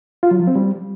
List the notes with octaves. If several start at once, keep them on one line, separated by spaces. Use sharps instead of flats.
F4
F#3
F3
C4
G3